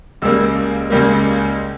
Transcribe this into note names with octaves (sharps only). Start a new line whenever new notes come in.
C#2 C#3 G3 A#3 E6
C#2 C#3 G3 A#3